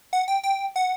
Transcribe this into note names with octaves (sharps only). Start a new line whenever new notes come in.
F#5
G5
G5
F#5